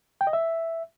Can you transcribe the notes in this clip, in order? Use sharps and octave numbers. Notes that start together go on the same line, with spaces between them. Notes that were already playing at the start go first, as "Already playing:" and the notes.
G5
D#5
E5